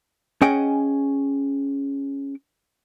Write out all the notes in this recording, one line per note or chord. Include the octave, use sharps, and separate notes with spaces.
C#4 G#4 D#5 F#5 G5